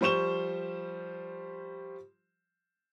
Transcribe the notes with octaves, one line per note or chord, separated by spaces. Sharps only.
F3 G3 C5 C#6 E7 G7